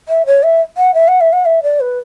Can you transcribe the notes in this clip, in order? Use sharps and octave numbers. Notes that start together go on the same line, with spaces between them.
E5
C#5
E5
F#5
E5
F#5
E5
F#5
E5
D5
B4